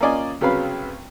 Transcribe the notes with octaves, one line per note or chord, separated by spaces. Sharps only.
A#3 C#4 F4 D5 D#5 G#5
C2 C#3 F#3 B3 F5 B5